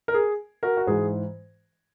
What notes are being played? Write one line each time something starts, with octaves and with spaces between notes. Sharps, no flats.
A#4
G#4
F#4 A#4
F#4
G#2 E3 G#4